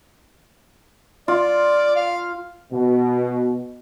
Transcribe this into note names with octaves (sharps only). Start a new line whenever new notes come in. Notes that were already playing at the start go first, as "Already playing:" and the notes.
F4 D5
F5
B2